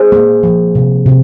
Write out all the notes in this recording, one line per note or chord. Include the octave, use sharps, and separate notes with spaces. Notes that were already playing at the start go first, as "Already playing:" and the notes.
Already playing: G#4 C5
A#3
F3
C3
C3